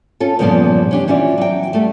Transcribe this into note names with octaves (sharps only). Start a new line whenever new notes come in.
C#4 F4 A4
E2 G2 A#2 C#3 F3 B3
C#4 D4 G4
E3 C#4 F4 F#4 D5
F#3 G5
G3 A3 A4